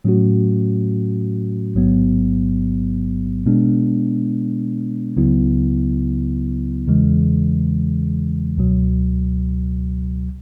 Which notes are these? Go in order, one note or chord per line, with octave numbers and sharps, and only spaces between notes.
A2 F#3 A3 C#4 F#4
A1 G#2 F#3 B3
B2 G#3 B3 D4
C#2 C#3 F#3 B3 E4
E2 C#3 E3 G#3
C#2 B2 F#3